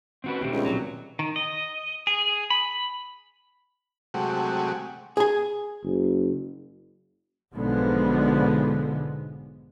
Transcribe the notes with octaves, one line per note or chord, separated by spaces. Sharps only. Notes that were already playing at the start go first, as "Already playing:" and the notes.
D#3 A3 C4 C#4 F#4 B4
B2 D#3 A3 C4 G4
C#2
A#2 F3 F#3 D5
D#3
D#5
G#4
B5
C3 F#3 G#3 A3 F#4 G4
G#4 G#5
F#1
B1 G#2 D3 F3 G#3 B3